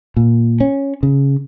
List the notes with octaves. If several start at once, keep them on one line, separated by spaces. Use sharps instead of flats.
A#2
C#4
C#3